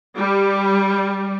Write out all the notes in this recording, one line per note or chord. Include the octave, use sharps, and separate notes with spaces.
G3